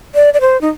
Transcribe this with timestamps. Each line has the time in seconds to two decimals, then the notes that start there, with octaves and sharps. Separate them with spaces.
0.15 D5
0.34 D5
0.41 C5
0.61 D#4